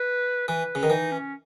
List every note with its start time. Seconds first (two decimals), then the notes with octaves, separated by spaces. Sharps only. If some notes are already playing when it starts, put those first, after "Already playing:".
Already playing: B4
0.48 E3 B4
0.75 C#3
0.83 D#3
0.90 E3 D#4
1.12 C#4